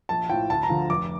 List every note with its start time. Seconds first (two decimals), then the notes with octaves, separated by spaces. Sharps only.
0.09 A#1 A5
0.29 A2 F3 G5
0.50 D2 A5
0.63 A#5
0.70 D3 F3
0.90 F1 D6